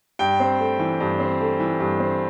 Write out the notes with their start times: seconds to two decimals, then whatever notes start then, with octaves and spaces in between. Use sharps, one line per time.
0.19 G2 G5
0.40 C4
0.60 A3
0.79 E3
1.00 G2
1.20 C4
1.40 A3
1.60 E3
1.80 G2
2.00 C4